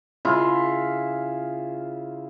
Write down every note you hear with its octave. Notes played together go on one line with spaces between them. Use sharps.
C#3 E4 F4